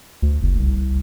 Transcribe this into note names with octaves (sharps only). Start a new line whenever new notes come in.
D2
F#1
C2